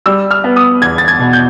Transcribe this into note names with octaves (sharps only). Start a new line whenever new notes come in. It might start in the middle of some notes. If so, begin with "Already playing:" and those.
G3 E6
F6
B3
D#6
E2 G#6
A6
G#6
B2
G6